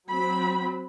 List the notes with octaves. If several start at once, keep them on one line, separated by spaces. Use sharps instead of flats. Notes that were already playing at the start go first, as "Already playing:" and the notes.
F#3 C4 B5